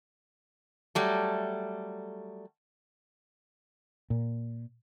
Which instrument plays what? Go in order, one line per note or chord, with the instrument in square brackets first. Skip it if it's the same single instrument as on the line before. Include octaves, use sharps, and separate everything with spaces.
[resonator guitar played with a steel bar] F#3 G3 A3
[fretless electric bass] A#2